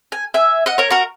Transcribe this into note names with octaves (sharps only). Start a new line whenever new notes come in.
G#5
E5 G#5
D#5 F#5
A#4 C#5
F#4 A#4